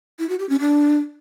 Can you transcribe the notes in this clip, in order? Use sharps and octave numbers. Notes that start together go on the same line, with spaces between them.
E4
F#4
G4
C#4
D4